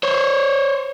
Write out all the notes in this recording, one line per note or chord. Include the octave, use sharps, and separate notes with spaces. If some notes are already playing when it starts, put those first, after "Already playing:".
C5 C#5